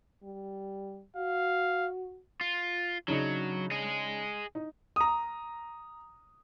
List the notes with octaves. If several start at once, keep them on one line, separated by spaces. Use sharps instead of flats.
G3
F#4 F5
F4
C#3 F#3 D4 D#4
G#4 D#5
D#4
A#5 D#6